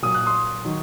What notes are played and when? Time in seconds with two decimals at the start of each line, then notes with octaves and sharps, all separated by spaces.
0.02 A#2 F#3 D#6
0.15 F#6
0.26 C6 D#6
0.65 D#3 F#3